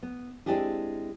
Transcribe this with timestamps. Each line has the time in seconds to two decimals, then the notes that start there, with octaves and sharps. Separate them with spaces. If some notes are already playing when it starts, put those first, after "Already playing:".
0.03 B3
0.46 G#3 C4 D4 E4 G4 G#4